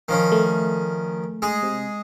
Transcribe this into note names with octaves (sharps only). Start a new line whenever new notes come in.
D#3 F3 C#4
A3
G#3 G#4
C3